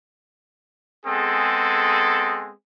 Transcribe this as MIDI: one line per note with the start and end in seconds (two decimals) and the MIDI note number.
1.05 2.52 56
1.05 2.52 59
1.05 2.52 60
1.05 2.52 68
1.05 2.52 69